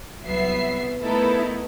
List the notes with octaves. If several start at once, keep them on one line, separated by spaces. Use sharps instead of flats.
C2 F#3 B3 E5 C7
A3 B3 D#4 E4 A4 A#4